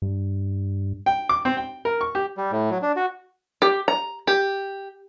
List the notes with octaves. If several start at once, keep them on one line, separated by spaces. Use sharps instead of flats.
G2
G5
D6
C4
G5
A#4
C#6
G4
G3
A2
F#3
D4
F#4
G4
A#5
G4